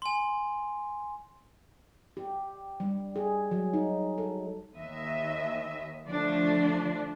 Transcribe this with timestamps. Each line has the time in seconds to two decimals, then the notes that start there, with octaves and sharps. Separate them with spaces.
0.02 G#5 C6
2.17 G4
2.80 G3
3.16 G#4
3.51 F#3
3.73 D#4
4.18 A4
4.76 D#2 D#5 E5
6.05 D3 F3 A3 D4